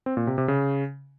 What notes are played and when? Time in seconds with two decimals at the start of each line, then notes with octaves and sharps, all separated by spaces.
0.06 C4
0.17 A#2
0.27 C3
0.38 C3
0.48 C#3